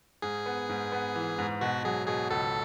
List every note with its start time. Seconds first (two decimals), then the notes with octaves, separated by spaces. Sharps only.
0.22 G#2 G#4
0.46 B3
0.69 G#2
0.92 B3
1.15 E3
1.38 G#2
1.61 B2 F#4
1.85 F#3 G#4
2.07 B2 G#4
2.30 C#2 A4